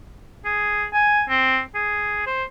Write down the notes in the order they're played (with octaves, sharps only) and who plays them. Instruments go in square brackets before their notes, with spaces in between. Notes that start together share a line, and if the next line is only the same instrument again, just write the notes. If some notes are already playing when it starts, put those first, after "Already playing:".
[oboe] G#4
G#5
C4
G#4
C5